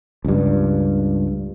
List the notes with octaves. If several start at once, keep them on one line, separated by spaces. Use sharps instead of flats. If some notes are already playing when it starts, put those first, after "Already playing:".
C#2 G2